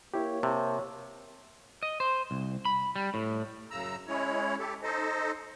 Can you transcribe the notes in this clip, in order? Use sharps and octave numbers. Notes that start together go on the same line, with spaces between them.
A#3 E4 G4 C#5
C3 A5
D#5
C5
C2
B5
G3
A2
F#2 C#3 A#5 E6
G#3 C#4 E4 C#5
G4 A4
D#4 A4 C5 D#5